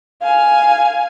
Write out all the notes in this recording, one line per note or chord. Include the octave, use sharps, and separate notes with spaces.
F5 G#5